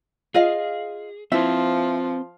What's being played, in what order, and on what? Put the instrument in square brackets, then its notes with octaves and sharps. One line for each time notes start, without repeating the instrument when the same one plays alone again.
[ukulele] F4 D#5 F5 [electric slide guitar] G#4
[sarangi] F3 [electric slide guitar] C4 B4 C5 [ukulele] E4 E5